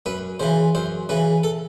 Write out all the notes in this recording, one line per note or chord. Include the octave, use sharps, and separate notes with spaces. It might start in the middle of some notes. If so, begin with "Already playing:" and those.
F#2 B4
C#3 E3 C5
F#2 C5
C#3 E3 B4
A4